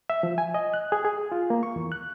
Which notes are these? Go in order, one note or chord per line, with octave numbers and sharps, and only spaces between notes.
E5
F3
G#5
D#5
F#6
G#4
G#4
F4
A#3
C#6
E2
F#6